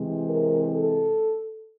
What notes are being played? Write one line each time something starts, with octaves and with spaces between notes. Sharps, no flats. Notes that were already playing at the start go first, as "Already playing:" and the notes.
Already playing: C3 E3 G#3 C4
A#4
A4